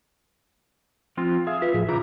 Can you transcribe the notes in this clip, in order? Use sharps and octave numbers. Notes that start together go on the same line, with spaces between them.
F3 C4 F4
G#4 E5 F5
F4 B4 E5
A2 F3 G#4
C#3 E3 F4 A#5 D6